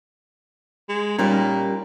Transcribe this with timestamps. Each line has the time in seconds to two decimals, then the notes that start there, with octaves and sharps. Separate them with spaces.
0.89 G#3
1.19 A#2 G3 C#4 D#4